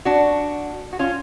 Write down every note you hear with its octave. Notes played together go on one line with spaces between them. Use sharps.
D4 F#4
F#4
C#4 F4